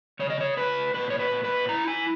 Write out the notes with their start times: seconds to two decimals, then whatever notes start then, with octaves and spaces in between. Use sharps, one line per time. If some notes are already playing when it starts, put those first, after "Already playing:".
0.19 C#3 C#5
0.30 D#5
0.41 C#5
0.57 C#3 B4
0.94 A#2 B4
1.10 C#5
1.19 B4
1.31 A#2
1.44 B4
1.69 E4 A#5
1.88 G#5